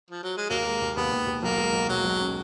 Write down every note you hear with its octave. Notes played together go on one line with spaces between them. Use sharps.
F3
F#3
G#3
D#2 F#3 A#3
G#3
D#2
D#2 B3
D#2
D#2
B1 A#3
G#3
B1
B2 F#3
B1
C#4